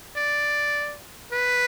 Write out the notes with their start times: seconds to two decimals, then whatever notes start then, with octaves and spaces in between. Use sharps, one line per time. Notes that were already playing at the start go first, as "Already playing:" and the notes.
0.16 D5
1.32 B4